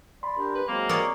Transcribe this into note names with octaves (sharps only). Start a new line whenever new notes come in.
D5 B5 C6
D4 G4 A#4
B4
F#3 G#3 A#3 C4
A#4 C#5 D5 A#5 D6 D#6